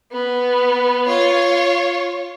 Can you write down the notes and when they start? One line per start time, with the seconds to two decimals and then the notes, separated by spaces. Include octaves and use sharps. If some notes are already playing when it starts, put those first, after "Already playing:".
0.12 B3
1.07 F4 C#5